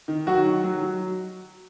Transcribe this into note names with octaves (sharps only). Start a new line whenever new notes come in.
D#3
F#3 F#4
D#3
F#3
F#3